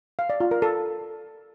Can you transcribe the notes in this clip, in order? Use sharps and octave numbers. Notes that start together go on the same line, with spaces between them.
F5
D5
F4
A#4
A4